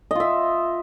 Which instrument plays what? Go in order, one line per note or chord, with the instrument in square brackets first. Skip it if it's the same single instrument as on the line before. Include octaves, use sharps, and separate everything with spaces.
[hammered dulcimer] D#5
F4
E5